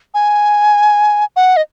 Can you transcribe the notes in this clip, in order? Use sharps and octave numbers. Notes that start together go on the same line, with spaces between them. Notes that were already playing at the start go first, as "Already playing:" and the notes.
G#5
F#5
D#5